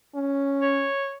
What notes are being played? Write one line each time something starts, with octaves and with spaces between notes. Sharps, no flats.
C#4
C#5